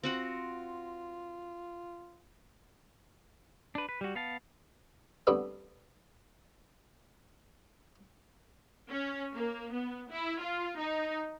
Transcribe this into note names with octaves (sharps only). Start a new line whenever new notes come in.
C4 F4 F#4 F#5
D4 B4
B4
G3 F#4
B3 F5 A5
D3 G3 A3 B3 C4
C#4
A#3
B3
E4
F4
D#4